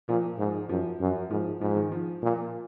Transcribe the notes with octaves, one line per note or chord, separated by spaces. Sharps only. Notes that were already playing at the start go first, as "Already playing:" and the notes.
A#2 F3
G#2
F#2 F3
F#2
G#2 F3
G#2 F3
D#3
F3
A#2